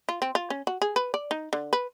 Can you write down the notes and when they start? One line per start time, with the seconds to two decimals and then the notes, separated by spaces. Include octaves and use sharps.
0.09 F4
0.22 C4
0.35 F4
0.50 C#4
0.67 F#4
0.82 G#4
0.96 B4
1.14 D5
1.31 D#4
1.53 D3
1.73 B4